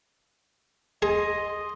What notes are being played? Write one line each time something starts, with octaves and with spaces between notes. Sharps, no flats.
G#4 D#5 C6